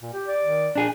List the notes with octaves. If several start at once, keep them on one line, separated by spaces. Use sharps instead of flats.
A#2
G4
D5
D#3
A#2 D4 G#4